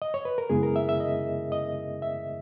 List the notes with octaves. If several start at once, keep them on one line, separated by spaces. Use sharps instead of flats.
D#5
C#5
B4
A#4
F#2 C#3 G#3 B3 E4 G#4
A#4
E5
E5
D#5
D#5
E5